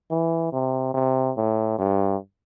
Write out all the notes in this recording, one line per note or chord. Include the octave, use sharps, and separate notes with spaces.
E3
C3
C3
A2
G2